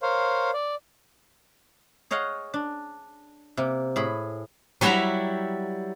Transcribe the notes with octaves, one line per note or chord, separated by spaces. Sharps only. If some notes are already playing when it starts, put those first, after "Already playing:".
A#4 C5 C#5 F5
D5
G#4 C#5 D#5 F5 F#5
D4
C3 A#3
A2 G#4 B5
F#3 G3 E4 E5 F#5 A#5